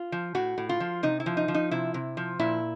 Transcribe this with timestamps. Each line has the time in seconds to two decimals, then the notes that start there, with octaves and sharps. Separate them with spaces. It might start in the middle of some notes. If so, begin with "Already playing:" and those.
Already playing: F4
0.12 F3
0.35 A2 F#4
0.58 A2
0.69 F4
0.80 F3
1.03 C3 D#4
1.20 E4
1.26 F3
1.37 D#4
1.48 F3
1.54 D#4
1.71 C3 E4
1.94 C3
2.17 F3
2.39 A#2 E4